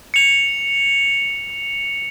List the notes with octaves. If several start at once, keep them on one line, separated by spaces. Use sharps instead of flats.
C#7 F7